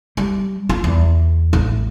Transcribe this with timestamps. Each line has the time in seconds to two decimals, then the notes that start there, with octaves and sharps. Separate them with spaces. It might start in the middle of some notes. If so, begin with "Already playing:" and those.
0.17 G3
0.69 F4
0.84 E2
1.53 A1